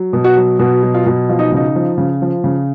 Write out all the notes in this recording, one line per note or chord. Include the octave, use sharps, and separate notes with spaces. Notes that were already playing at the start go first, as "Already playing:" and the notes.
Already playing: F#3
B2
F#4
F#3
B2 F#4
F#3
F4
B2
F3 F4
D#4
C#3 D#4
F3
C#3
F3
C#3